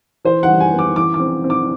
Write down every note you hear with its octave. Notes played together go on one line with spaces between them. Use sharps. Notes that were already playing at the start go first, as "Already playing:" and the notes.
E3 C5
F#5
G3
G#5
B3
D6
E3 D6
D6
C4
C4
D6